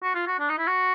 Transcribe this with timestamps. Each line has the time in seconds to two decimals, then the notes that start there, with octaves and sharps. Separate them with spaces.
0.03 F#4
0.15 F4
0.27 F#4
0.40 D4
0.49 D#4
0.58 E4
0.67 F#4